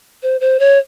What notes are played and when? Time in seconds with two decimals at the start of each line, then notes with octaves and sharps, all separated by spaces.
0.23 C5
0.41 C5
0.60 C#5